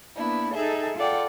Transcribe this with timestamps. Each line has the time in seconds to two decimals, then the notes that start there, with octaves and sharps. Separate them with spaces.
0.16 A#3 B3 D4 E4
0.53 D#4 G#4 A4 E5
0.97 F4 A4 D5 F#5 G5